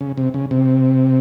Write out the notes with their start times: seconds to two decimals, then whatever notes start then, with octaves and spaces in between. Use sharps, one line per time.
0.01 C#3
0.17 C3
0.34 C#3
0.51 C3